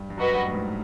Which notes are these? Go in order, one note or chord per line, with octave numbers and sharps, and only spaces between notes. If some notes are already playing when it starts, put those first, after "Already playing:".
Already playing: G2
G2
F#2 F#4 B4 D#5
G2
A2
G#2